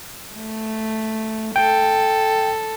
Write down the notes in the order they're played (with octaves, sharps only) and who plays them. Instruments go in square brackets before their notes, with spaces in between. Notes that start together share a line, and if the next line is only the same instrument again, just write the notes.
[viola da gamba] A3
[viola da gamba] A4 [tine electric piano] G5